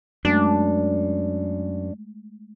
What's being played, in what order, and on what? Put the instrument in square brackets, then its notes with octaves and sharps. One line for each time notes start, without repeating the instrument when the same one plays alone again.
[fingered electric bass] F#2 [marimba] G#3 A3 [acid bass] D4